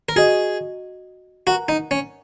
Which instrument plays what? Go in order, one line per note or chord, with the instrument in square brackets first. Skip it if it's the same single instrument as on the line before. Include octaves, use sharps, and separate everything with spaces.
[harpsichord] A#4
[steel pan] F#4 D#5 F#5 [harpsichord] G#4
[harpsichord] F#4 [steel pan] A#4 F#5 A#5
[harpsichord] D#4
C#4